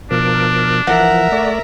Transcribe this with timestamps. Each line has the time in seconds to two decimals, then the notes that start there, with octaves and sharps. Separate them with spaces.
0.11 B2 F3 D4 A#4
0.87 E3 F3 A#4 E5 F#5
1.32 A3 D5